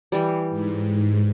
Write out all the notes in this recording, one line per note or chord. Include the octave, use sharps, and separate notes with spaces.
E3 G3
G#2